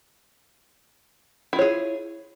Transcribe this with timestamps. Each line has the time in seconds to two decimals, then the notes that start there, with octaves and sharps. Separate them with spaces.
1.53 E4
1.56 F4
1.59 C#5
1.62 G#4